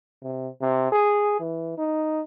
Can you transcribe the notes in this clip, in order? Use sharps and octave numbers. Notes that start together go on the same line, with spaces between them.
C3
C3
G#4
E3
D#4